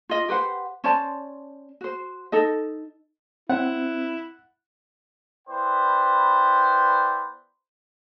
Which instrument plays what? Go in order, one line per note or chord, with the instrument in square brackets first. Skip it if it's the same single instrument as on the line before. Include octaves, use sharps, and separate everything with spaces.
[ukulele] F4 D#5
G4 B4 C5 F#5
C#4 C5 D5 A5
F#4 C5
D#4 A4 D#5
[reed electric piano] C4 [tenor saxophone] E4 [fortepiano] F#5
[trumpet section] B3 E4 B4 C5 D5 G5